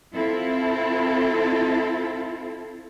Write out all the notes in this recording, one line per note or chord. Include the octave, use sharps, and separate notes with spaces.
C4 E4 F4 A4